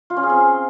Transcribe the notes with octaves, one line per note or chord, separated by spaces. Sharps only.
F4
C#4
G#4
C4